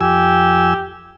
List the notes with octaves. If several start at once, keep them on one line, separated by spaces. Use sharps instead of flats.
F2 G4 G#5 E6